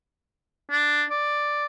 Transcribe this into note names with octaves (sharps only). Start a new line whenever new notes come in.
D4
D5